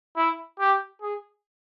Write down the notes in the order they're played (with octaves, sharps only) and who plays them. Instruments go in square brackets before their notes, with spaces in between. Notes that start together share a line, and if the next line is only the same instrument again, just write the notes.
[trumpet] E4
G4
G#4